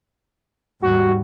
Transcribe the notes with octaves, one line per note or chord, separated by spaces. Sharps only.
D#2 G#2 G3 F#4